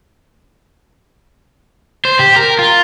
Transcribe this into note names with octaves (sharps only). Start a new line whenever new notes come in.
C5
G4
A#4
F4